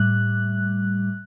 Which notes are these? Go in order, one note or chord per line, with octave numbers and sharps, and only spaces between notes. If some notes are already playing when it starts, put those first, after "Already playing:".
Already playing: A2 G3 F#6